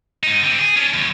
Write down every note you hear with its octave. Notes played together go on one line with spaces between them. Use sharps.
G#2 D#4
D3 C4
G#4
C#4 D4
D#2 F#3